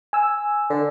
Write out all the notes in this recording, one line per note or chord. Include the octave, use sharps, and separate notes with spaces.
G#5 E6
D3